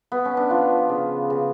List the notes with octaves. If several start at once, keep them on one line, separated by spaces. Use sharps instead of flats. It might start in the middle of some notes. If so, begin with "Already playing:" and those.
B3
C#4
D4
F3 F4
C#3
C#3